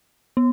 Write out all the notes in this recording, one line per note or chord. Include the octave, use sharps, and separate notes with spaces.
B3